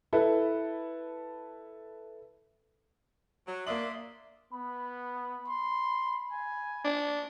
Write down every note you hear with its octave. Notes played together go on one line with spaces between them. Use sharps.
E4 A4 B4
F#3
A#3 D4 D5 E5 C6 D#6 F#7
B3 B5
C6
G#5
D4